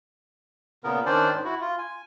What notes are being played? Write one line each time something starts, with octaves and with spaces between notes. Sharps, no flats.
A#2 C#3 B3 A#4
D#3 C#4 D4 C5 D5
G#2
E4 F#4
F4
G#5